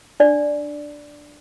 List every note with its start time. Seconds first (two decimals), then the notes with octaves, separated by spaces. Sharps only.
0.20 D4 D5